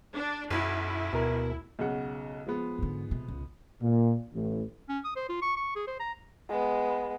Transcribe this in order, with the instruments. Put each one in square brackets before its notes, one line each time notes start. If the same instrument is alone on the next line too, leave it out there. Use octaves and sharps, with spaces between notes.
[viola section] D4
[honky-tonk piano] B1 [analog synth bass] F#2 [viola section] E4
[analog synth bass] D2 [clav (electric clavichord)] B2 A#4
[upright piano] B1 C#3 F#5
F3 G#3 B3
[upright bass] G#2 D3
C3
C#2
[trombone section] A#2
A1
[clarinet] C#4
D#6
C5
F4
C#6
C#6
G#4
C5
A#5
[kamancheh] G#3 B3